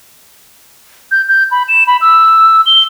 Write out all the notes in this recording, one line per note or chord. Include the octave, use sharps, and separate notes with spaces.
G6
G6
B5
E7
B5
E6
G7